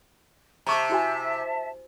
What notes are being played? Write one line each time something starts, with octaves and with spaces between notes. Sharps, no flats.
C3 E5 A5 A#5 C#6 D6
E4 F#4 G#5